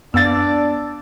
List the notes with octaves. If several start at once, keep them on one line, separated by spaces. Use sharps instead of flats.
F#2 B3 D4 D5 F5 E6 A6